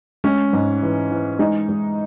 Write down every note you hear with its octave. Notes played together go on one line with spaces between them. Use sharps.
G#3 C#4
G#2
E3
E3
G#3 D#4
G#3